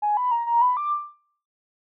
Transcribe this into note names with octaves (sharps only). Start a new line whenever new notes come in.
G#5
B5
A#5
A#5
B5
D6